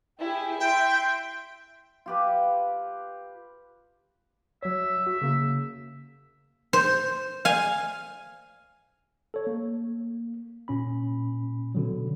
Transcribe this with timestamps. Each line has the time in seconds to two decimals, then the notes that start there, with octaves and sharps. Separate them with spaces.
0.19 E4 G4 G#4
0.60 E5 G5 C6
2.06 F4 G4 B4
4.63 F#3 C#5 E5
5.07 F#4
5.22 C#3 A#3
6.73 C5
7.45 F5 G#5
9.34 A4 C#5
9.47 A#3
10.68 A#2 C#4 B5
11.75 B2 D3 F#3